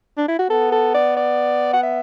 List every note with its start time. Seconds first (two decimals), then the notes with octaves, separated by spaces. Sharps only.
0.17 D4
0.28 E4
0.39 F#4
0.50 B3 A4
0.72 A4
0.95 D5
1.17 D5
1.73 F#5
1.83 E5